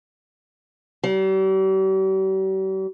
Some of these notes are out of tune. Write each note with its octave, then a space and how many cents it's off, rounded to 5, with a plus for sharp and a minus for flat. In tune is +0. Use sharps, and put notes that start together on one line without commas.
G3 -45